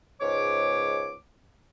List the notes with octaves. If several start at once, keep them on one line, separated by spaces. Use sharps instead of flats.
C#2 G#2 C#5 D6